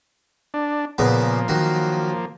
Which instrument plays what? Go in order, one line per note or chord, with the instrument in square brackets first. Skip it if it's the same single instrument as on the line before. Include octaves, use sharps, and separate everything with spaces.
[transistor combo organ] D4
[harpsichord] A#2 C#3 B3 [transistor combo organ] F3 A#3
[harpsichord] D#3 F#3